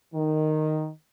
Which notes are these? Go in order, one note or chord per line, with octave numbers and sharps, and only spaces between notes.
D#3